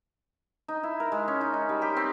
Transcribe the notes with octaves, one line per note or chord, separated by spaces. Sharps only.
D#4
E4
A#4
G#3
C#4
D#4
D#4
G3
G4
C4